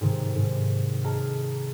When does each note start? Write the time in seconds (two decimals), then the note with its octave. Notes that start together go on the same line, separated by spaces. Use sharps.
0.01 G#2 C3 D#3
0.36 G#2
1.04 G#4 D#5 A5 A#5 F6